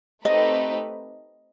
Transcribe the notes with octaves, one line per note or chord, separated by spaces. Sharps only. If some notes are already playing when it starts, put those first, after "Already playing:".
A3 C4 D#4 G4 B4 D#5